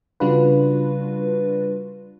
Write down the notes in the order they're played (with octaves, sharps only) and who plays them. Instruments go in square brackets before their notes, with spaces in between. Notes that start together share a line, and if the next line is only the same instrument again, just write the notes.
[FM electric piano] C#3 G3 D4 F4 F#4 B4